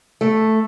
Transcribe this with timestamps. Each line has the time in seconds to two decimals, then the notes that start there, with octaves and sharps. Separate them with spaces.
0.21 A3